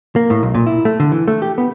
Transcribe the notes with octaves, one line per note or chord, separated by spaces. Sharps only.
A#3
A2
B1
A#2
E4
A3
D3
E3
A3
G4
B3